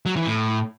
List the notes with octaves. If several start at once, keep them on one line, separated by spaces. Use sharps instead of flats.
F#3
E3
A2